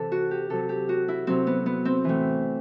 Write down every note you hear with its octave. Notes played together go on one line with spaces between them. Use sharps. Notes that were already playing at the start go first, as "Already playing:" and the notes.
Already playing: C3 E3 A4
F#4
G4
C3 F#3 A4
G4
F#4
E4
C3 F#3 C4
B3
B3
C4
A2 E3